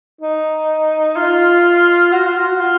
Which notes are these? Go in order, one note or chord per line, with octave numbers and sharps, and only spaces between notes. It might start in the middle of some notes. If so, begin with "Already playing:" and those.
D#4
F4
F#4
F4
F#4
F4